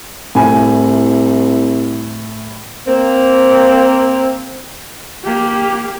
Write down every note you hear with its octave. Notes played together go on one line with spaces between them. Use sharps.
C2 A2 G#5
A#3 C4
A#3 G4